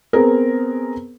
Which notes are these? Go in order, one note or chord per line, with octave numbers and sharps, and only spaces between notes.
B3 C4 G#4 A#4